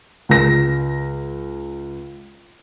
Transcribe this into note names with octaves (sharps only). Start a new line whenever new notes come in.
C#2 A#6